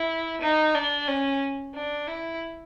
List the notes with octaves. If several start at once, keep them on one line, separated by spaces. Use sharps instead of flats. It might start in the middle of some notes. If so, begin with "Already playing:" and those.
Already playing: E4
D#4
D4
C#4
D4
E4